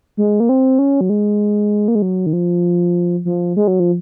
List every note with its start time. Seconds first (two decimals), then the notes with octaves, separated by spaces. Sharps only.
0.17 G#3
0.40 A#3
0.49 C4
0.79 C#4
1.01 F#3
1.10 G#3
1.88 A#3
1.95 G#3
2.02 F#3
2.26 D#3
2.33 F3
3.25 F3
3.57 G#3
3.68 F#3
3.80 F3